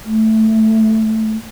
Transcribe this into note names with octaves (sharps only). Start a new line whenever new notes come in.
A3